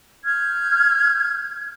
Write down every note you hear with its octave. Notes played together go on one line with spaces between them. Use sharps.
F6 G6 G#6